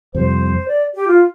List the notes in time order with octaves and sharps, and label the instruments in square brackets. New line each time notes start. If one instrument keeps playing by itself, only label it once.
[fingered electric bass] F2 C3 G3 [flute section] C5
[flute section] D5
G4
F4